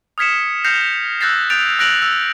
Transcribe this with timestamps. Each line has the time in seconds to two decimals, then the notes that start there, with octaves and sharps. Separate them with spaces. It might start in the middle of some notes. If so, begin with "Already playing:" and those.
0.18 D#6 F6 G#6 B6 C#7 E7
0.64 F6 G6 A#6 C7 C#7 F7
1.21 E6 F#6 G6 A6 A#6 C7
1.50 D#6 F#6 G6 A6 D7 F7
1.79 E6 F#6 A#6 D7 F7 F#7
2.02 E6